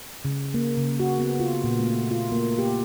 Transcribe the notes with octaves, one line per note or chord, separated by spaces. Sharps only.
C#3
A#3
C#3
F#4
B3
F4
A#2
A3
F4
A#3
G4